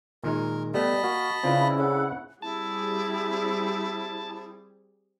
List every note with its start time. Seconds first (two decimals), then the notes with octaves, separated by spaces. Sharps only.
0.23 A#2 D#3 G#3 A#4
0.74 G3 A3 B3 D#5 A5 B5
1.04 A#3 F#4
1.43 C#3 C4 D4 E4 F4 B4
1.78 C#3 A4 F#5
2.42 G3 C4 E4 G#4 A5